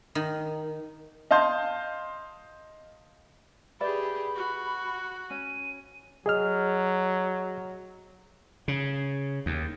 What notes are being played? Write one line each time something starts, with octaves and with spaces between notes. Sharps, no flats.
D#3
D#5 F5 A5 C6 G6
G4 G#4 B4 D5 E5 B5
F#4
C#4 D#7
F#3 G#4 D#5 F6
C#3
D#2